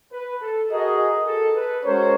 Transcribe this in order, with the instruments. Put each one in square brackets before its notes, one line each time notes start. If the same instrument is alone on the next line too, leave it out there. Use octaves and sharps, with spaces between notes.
[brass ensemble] B4
A4
[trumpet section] F#4 A#4 D#5 [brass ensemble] G#4
[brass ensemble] A4
B4
[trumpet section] G#3 C#4 F#4 A#4 C#5 [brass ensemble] C5